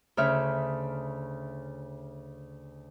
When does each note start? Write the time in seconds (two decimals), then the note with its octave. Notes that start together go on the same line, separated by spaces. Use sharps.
0.17 D2 C#3 E5 F6